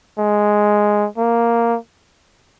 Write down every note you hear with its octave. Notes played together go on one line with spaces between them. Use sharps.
G#3
A#3